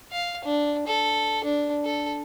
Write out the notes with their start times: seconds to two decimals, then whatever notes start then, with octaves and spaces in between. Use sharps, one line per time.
0.12 F5
0.44 D4
0.87 A4
1.44 D4
1.85 A4